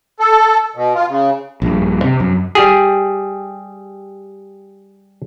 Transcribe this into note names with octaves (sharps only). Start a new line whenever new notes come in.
A4
B2
F4
C#3
A#1 G2
C3
F#2
G3 G4 G#4